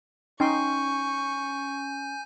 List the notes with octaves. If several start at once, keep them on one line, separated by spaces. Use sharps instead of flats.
C#4 D#4 G5 G#5 C6 C#6 G6